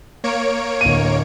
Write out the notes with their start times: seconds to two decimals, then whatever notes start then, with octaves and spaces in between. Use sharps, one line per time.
0.24 A#3 C#5 D7
0.81 D1 D#7